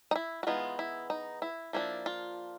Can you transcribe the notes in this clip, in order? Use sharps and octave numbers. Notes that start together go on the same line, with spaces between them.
D#4
E4
F#4
E3 G#3 B3 D#4 F4
E4
D#4
E4
F3 A#3 D4 E4
F4